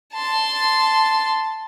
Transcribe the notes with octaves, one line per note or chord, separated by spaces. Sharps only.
A5 C6